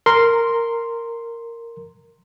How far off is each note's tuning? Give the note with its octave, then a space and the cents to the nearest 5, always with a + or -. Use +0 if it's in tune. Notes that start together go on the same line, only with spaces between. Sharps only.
A#4 -10 C6 +0